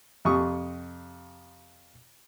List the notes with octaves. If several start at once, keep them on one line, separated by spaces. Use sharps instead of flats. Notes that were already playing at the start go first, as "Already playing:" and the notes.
F2 C3 C#6 D#6